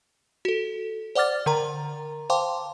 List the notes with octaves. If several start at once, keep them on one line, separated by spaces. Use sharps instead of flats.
F#4 A4
C5 D5 F#5 D6 F6 A6
D3 A#4 A#5
C5 F5 G5 A5 C6 D6